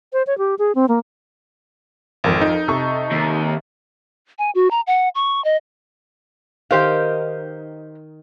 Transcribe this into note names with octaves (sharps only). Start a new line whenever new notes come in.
C5
C#5
G4
G#4
C4
A#3
G#1 F2 A#4 F5
D#4
C3 A4 C#6
D#2
G#5
F#4
A#5
F#5
C#6
D#5
D#3 D#4 G4 C5 F5